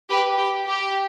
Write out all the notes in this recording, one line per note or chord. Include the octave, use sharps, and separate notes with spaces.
G4 B4
G4
G4